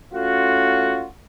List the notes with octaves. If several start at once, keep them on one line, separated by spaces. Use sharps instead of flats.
A3 C#4 F4 F#4